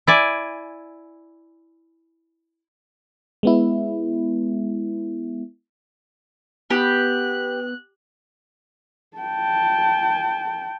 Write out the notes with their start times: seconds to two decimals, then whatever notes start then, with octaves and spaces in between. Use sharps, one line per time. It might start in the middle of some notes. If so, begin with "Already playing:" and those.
0.07 E4 D5 G#5
3.43 G#3 B3 E4
6.70 B3 G4 F#6
9.17 G5 A5